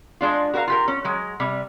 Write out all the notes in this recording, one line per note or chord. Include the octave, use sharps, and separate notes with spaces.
G#3 D4 F4
F#4 A#4 B4 F5
F4 G4 A#4
C#4
F#3 G#3
C3 G3